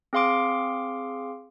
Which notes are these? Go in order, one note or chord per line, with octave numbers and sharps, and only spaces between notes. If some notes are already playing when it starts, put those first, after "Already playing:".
C4 G#4 F5 C6 D6 D7